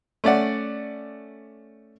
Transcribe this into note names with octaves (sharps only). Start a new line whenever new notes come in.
A3 C#4 D5 F#5